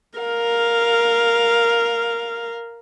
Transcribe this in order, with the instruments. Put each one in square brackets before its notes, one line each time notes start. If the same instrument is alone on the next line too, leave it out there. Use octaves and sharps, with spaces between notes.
[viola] A#4 F5